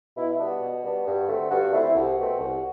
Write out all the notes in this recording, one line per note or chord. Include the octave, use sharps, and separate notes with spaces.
B2 E4
E4
G3 B3 D4
F#4
B2
G3 B3 D4
G2
D3 A3 C4
G2 F#4
D3 A3 C4 E4
C2 F#4
B2 A3 C4
C2